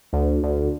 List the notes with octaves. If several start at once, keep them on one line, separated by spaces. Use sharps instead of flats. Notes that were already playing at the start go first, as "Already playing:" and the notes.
D2
D2